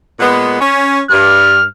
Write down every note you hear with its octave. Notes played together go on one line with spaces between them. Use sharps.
A#2 G#3 B3
C#4
G2 F6